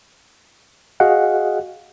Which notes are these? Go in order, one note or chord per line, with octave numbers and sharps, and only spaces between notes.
F#4 G#4 D#5 F5 F#5